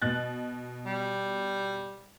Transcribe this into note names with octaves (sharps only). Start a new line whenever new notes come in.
B2 F#6 A6
G3